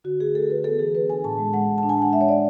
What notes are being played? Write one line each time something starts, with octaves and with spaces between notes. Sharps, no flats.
D3 F#4
A3 G#4
A3 A4
D3 B4
B3 A4
E3 G#4
B3 B4
D4 G#5
A2 A5
G#3
G#3 F#5
A2
A5
D4
G#5
G#3 F#5
G#3 E5
C#5
G#3 D5